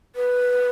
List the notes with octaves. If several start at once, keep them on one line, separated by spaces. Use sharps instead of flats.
B4